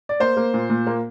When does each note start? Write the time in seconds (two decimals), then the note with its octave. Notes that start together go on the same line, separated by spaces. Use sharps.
0.09 D5
0.20 A#3 C5
0.37 A#3
0.54 A#2
0.70 A#2
0.87 A#3